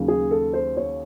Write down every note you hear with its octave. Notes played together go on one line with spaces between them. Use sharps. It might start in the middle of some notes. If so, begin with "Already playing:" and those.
Already playing: D#2 C#3 F#3
G#4
A4
C5
C#5